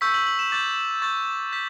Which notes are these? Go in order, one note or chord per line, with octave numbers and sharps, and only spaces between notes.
C#6 E6 G6 B6
F#7
F#7
E7
D6 G6 A6
C#6 G6 A6
G6 B6